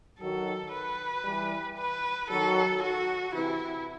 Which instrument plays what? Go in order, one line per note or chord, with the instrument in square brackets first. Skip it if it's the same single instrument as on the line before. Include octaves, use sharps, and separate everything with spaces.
[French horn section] D#3 F#3 [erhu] A4
[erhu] B4
[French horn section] E3 G3
[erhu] B4
[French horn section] D#3 F#3 [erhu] A4
[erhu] F#4
[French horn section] C3 E3 [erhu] E4